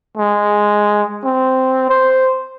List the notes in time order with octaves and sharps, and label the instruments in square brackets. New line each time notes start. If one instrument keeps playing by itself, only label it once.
[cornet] G#3
C4
C5